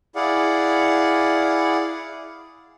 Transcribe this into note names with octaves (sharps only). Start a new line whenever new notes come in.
E4 G#4 D5 F5 F#5